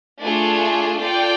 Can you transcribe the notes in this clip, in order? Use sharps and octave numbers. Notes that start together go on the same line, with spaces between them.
A3 D4 F4 G#4
F4 A4 D5 G5